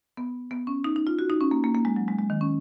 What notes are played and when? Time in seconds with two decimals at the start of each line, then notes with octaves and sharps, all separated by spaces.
0.17 B3
0.51 B3
0.67 C#4
0.84 D#4
0.96 D#4
1.07 F4
1.19 F#4
1.30 D#4
1.41 C#4
1.51 A#3
1.64 A#3
1.74 A#3
1.85 G#3
1.96 F#3
2.08 G#3
2.19 G#3
2.30 D#3
2.41 C#4